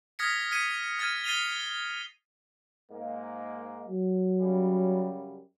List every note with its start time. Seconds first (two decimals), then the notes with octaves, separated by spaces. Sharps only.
0.19 D#6 F6 G#6 A#6 B6 C#7
0.51 F6 G#6 B6 C#7 D#7
0.99 F6 G#6 A6 D#7
1.24 A6 C7 D#7 F7 G7
2.91 G#2 G#3 A#3
3.88 F#3
4.40 F#2 C#3 G3